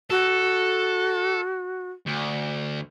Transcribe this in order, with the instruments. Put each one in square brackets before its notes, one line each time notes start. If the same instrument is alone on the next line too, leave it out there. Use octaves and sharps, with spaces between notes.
[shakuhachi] F#4 [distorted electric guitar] A4
[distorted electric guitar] D2